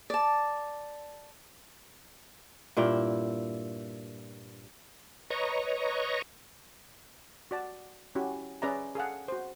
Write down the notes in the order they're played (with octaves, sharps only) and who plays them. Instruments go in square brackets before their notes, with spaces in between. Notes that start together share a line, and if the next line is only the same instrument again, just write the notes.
[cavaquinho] D5 A5
[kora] G2 A#2 E4 G5
[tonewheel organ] B4 C#5 D#5 A#5 C#6
[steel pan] F#4 D5 A5
C#4 E4 F#4 G4
C#4 G#4 B4 D5 E5 A#5
G#4 A4 F5 F#5
F#4 C5